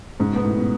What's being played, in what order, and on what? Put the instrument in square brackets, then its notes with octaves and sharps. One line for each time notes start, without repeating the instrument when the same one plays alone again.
[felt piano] G#2 [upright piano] C#3
[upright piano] B2 [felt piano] B3
[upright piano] A2
B2